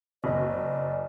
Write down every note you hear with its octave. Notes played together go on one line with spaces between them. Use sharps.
F#1 D5 D#5 G#5